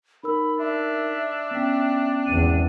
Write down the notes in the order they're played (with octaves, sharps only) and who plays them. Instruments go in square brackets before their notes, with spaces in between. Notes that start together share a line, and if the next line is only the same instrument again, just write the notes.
[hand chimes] D#4 A#4 E6 [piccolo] B5
[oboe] D4 [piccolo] E5
[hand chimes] B3 C#4 G5
[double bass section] G#1 E2 [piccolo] D#7